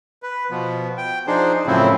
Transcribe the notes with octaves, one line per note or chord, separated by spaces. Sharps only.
B4
B2 F3 B3
G5
F3 D4 D#4 G#4 C5
F#2 A2 C#3 F3 C4 E4